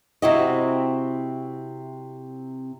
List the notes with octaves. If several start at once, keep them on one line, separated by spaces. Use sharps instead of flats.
C3 C4 E4 F#4 D#5